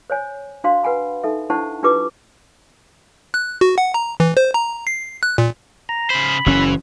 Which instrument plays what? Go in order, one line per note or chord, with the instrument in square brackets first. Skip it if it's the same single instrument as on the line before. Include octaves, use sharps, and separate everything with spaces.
[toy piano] C5 C#5 G#5
D4 F#4 C5 F5 C6
B4 F#5 G#5 B5
D#4 A4 E5
D4 E4 C5 F#5 A5 C#6
D4 F4 G4 B4 D6
[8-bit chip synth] F#6
F#4
F#5
A#5
E3
C5
A#5
C7
F#6
A#2
[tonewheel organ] A#5
[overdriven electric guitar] C#3 C5 [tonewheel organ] B5
[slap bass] F#1 C#4 [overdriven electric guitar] E3